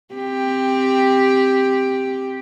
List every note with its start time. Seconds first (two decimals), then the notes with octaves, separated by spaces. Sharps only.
0.15 C4 G4